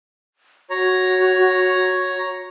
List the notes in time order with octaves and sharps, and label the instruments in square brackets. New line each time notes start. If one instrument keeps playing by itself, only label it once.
[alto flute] F#4 [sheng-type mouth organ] C#5 A#5